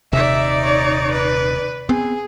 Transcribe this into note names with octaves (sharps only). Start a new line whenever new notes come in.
D#1 C3 D#4 D5 E5
C#5
B4
B3 C4 G#4